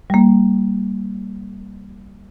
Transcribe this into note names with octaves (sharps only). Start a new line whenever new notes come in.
G3 A#3